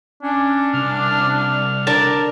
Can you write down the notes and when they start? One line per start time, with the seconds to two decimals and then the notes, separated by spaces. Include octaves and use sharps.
0.23 C#4 D4
0.74 C2 F6
1.87 D4 A#4 A5